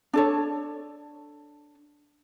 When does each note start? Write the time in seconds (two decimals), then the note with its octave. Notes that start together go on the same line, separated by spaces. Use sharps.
0.14 D4 A4 C#5